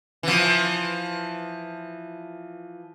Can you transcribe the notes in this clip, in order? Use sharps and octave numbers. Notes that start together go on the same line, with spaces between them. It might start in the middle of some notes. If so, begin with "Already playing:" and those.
E3 F3